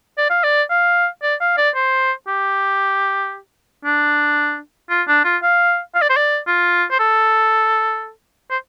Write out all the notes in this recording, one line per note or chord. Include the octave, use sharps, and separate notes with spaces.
D5
F5
D5
F5
D5
F5
D5
C5
G4
D4
F4
D4
F4
F5
F5
D5
C5
D5
F4
C5
A4
C5